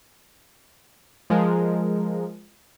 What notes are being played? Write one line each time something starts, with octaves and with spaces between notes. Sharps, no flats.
F3 G#3 A#4